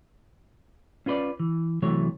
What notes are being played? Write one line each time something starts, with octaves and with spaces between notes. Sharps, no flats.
C#4 F4 B4 C5 D5
E3
C3 E3 F#3 A3 C#5